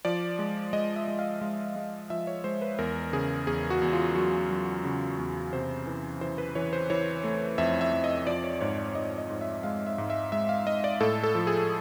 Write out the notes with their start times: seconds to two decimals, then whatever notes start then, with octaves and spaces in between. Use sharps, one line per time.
0.05 F3 D5
0.39 G#3
0.73 G#3 D#5
0.96 E5
1.08 G#3
1.19 F5
1.41 G#3 F5
1.76 G#3
2.10 F3 E5
2.27 C#5
2.44 G#3 C5
2.62 B4
2.79 E2 A#4
3.13 C#3 G#4
3.47 E2 G#4
3.70 F#4
3.82 E2
3.93 F4
4.15 F#3 F#4
4.50 F#3
4.84 C#3
5.18 E2
5.53 C3 C5
5.87 E3
6.21 E3 C5
6.38 B4
6.55 E3 C#5
6.73 C5
6.90 E3 C#5
7.24 A3
7.58 F2 E5
7.81 E5
7.93 F2
8.04 D#5
8.27 F3 D5
8.44 C#5
8.61 G#2 C#5
8.78 D5
8.95 G#2 D#5
9.18 D#5
9.30 G#2
9.41 E5
9.63 G#3 F5
9.87 E5
9.98 G#2
10.10 E5
10.32 G#3 E5
10.49 F5
10.66 G#3 D#5
10.84 D5
11.00 A2 A4
11.23 A4
11.35 F3
11.47 G#4